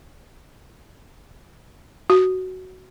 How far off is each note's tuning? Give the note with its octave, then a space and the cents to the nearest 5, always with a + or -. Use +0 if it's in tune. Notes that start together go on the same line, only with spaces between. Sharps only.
F#4 +5